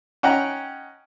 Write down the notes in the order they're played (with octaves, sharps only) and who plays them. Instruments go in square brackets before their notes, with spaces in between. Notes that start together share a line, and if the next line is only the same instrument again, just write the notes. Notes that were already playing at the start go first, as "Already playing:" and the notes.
[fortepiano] C#4 D#4 F#5 G5 A#5